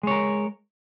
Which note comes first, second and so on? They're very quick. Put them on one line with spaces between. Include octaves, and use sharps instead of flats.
G#3 C#5 A#4